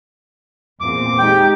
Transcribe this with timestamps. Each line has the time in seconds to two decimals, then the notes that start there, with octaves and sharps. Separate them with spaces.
0.81 E2 A#2 C4 D6
1.18 G#3 D#4 G4 G5